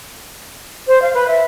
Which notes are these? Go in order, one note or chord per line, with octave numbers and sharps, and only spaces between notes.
C5
F5
B4
E5